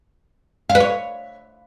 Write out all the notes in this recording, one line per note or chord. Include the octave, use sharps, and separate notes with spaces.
F5
B4
C#5